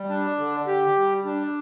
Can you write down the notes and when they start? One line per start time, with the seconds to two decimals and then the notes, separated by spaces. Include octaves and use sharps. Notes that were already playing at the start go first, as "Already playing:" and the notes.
Already playing: G3
0.09 D4
0.38 D3
0.67 G4
0.96 G3
1.25 D4